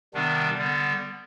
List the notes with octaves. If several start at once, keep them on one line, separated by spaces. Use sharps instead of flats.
C3 D#3 G3 B3 D4
D3 G3 B3